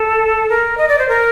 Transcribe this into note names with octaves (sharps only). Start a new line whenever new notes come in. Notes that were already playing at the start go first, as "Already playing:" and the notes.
Already playing: A4
A#4
D#5
D5
C5
A#4